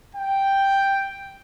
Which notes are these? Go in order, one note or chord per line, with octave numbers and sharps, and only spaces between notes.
G5